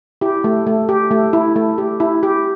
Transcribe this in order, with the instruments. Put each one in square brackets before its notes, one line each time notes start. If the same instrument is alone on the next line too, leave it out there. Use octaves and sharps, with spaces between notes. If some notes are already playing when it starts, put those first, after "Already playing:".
[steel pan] E4 G4
A3
A3
G4
A3
E4
A3
G4
E4
G4